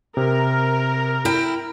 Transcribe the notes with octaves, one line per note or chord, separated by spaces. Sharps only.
C3 A#4
E4 G5